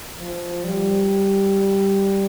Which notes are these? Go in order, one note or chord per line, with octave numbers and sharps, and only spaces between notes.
F3
G3